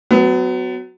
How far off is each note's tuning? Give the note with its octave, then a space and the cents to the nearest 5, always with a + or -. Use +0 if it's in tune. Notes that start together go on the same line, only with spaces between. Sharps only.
F#3 +0 B3 +30